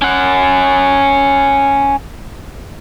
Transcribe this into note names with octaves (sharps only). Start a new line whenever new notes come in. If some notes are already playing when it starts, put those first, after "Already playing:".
C#4 F#5